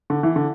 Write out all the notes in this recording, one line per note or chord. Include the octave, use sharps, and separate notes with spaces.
D3
E3
D3